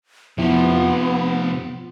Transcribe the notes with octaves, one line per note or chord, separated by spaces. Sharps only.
F2 C3 F3 B3 E4 G5
F4